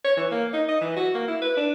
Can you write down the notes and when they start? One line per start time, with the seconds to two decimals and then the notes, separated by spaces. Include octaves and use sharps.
0.05 C#5
0.17 E3
0.31 A#3
0.53 D#4
0.68 D#5
0.81 E3
0.96 F#4
1.15 A#3
1.28 E4
1.42 B4
1.57 D4